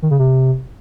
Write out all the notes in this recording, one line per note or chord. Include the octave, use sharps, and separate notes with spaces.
D#3
C#3
C3